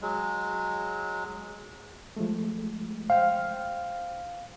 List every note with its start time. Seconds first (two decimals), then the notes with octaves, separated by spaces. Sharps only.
0.02 F#3 G#3
2.16 F3 G#3 A3
3.10 C5 F5 G5 F6